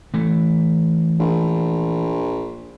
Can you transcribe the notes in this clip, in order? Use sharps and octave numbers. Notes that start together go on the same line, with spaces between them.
E3 A3
A#1